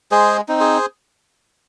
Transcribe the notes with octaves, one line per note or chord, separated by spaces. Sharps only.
G#3 G#4 C5
C4 D#4
G#4 C5